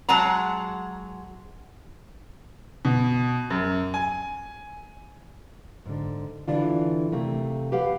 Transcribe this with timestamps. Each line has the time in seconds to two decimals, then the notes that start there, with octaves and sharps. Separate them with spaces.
0.09 F#3 G#3 F#5 A5 A#5
2.85 B2
3.50 F#2
3.94 G#5
5.86 G#2 D3
6.48 D3 E3 D4 F4
7.12 C3 A3 A#3
7.72 G4 B4 F5 F#5